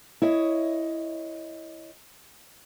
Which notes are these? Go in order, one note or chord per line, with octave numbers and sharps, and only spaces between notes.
E4 C#5 D#5